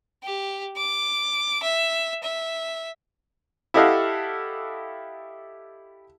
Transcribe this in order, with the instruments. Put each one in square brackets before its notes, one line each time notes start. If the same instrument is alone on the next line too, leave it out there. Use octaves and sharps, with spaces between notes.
[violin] G4
D6
E5
E5
[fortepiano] E4 G4 A4 D#5 F5 F#5